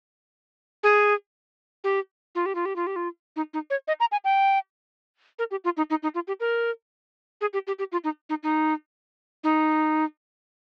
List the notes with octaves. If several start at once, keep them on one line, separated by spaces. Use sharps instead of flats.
G#4
G4
F4
G4
F4
G4
F4
G4
F4
D#4
D#4
C#5
D#5
A#5
G#5
G5
A#4
G4
F4
D#4
D#4
D#4
F4
G4
A#4
G#4
G4
G4
G4
F4
D#4
D#4
D#4
D#4